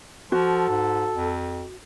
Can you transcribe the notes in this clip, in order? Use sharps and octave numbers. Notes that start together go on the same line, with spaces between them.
F3 F#4 A4
G#2
F2